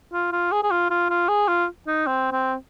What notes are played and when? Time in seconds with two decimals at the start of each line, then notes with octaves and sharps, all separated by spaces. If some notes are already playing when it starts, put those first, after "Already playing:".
0.13 F4
0.32 F4
0.52 G#4
0.63 G#4
0.71 F4
0.90 F4
1.10 F4
1.29 G#4
1.48 F4
1.87 D#4
2.07 C4
2.32 C4